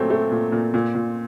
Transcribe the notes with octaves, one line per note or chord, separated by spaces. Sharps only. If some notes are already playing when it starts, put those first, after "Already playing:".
Already playing: A#2 F#3 A3 C4
A3
A#2
A#2
A#2
A#2